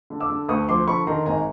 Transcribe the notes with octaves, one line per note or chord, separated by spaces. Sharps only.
D3
D6 E6
D3
D2 C#6 D#6
F3 C6 D6
D3 B5 C#6
D#3 A#5 C6
G#1 G#5 A#5